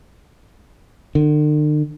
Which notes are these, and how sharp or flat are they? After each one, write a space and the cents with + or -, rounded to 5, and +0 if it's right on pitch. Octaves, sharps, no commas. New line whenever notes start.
D3 +45